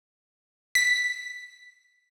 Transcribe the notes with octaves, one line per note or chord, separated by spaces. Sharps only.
B6